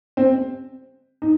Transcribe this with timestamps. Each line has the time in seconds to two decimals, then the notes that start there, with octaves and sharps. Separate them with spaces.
0.17 C4
1.22 D#4